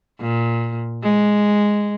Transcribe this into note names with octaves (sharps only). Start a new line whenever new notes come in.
A#2
G#3